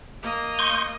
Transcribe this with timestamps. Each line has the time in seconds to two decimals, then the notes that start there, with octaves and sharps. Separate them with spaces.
0.23 A#3 D#5
0.59 C6 C#6 G6